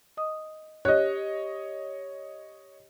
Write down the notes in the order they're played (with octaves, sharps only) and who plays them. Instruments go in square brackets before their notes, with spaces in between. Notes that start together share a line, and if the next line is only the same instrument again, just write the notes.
[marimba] D#5 D#6
[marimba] G4 F#6 [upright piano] C#5 D#5